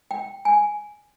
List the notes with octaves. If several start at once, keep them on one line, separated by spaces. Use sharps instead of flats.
G5
G#5